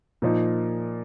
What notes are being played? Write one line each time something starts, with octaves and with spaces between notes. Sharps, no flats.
A#2 F3 A#3 D#4